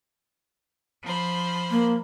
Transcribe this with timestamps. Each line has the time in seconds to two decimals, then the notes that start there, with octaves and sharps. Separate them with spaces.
1.03 F3 C5 B5
1.71 A#3